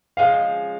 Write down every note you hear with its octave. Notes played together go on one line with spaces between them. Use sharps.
F3 G#3 C#4 F5